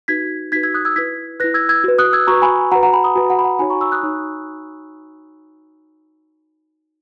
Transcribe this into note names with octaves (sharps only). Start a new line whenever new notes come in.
D#4 F#4 B4 G#6 B6
D#4 F#4 B4 G#6 B6
E6 G#6
D#6 F#6
E6 G#6
E4 B4 G#6 B6
E4 B4 F#6 A#6
E6 G#6
E6 G#6
F#4 B4
D#6 F#6
E6 G#6
F#4 B4 A#5 C#6
G#5 B5
F#4 B4 F#5 A#5
F#5 A#5
G#5 B5
B5 D#6
F#4 B4 G#5
F#5 A#5
B5
F#5 A#5
D#4 F#4 C#5 G#5 B5
A#5 C#6
C#6 E6
D#6 F#6
D#4 F#4 C#5